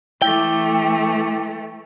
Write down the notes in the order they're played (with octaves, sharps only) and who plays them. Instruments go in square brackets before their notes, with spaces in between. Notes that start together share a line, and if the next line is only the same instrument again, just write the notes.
[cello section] E3 A3 [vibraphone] E4 D6 [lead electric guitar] G5